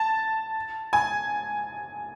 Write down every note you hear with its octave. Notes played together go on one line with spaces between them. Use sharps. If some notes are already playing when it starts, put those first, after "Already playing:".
Already playing: A5
G#5